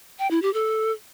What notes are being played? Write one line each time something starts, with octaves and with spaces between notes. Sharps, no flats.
G5
E4
G4
A4